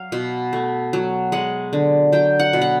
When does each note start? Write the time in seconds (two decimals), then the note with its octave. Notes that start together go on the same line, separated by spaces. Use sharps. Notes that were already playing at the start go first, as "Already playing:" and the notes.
Already playing: F#3 F5
0.12 B2
0.53 A3
0.93 F#3
1.32 G#3 F#5
1.73 D3
2.12 F#3 G5
2.40 F#5
2.53 B2
2.62 F#5